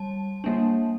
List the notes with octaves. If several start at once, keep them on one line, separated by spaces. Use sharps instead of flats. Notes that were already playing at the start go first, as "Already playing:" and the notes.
Already playing: G3 A5
G3 A#3 D4